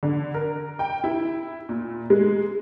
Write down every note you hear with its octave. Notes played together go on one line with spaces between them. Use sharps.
D3
A#4
G5
E4
A#2
G#3